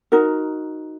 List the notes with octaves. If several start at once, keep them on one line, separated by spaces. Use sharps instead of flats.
D#4 F#4 A#4